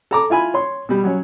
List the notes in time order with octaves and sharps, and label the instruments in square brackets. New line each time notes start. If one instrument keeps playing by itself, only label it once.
[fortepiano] A4 A#5 D6
E4 F4 G#5 B5
C#5 C6
B2 G3
F#3 C#4